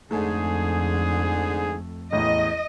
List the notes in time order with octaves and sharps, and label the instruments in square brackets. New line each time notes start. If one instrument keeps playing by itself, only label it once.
[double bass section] F2 [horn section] G#2 D3 G#4 [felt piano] A3
[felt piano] A1 E2 [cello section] D#5